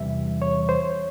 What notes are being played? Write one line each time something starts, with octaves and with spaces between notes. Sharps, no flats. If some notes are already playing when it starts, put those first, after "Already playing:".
Already playing: E2 C3 E3 G3 E5
C#5
C5